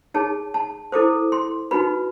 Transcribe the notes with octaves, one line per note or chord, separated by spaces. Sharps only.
D#4 G#4 C#5 A5
A5
E4 A4 C5 D6
C6
D#4 F#4 B4 B5